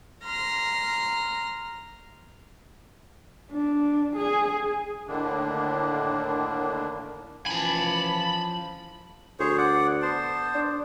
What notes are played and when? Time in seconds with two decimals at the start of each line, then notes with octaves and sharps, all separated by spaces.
0.25 A#5 C6 F6 A#6
3.51 D4
4.16 G#4 G#5
5.08 A2 D3 D#3 A#3 D4
7.46 E3 F3 C#4 G#5 A5 B5
9.39 D2 G#4 C5 C#5
9.58 D5 F#5
10.02 B3 C5 A5
10.54 D4